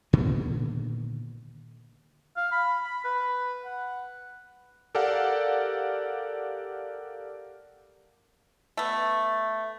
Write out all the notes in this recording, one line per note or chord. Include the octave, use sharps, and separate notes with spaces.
A#2 D3 D#3 B3
F5
B5
B5
B4
F#5
G4 A4 A#4 D5 F5 F#5
A3 B3